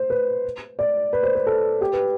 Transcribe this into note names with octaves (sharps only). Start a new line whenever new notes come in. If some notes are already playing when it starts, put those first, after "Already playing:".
Already playing: C5
B4
D5
B4
C5
B4
A4
G4
B4